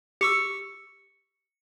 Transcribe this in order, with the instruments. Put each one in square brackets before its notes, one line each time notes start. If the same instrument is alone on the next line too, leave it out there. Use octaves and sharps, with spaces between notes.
[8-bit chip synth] G4 C#6 E6 [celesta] C#7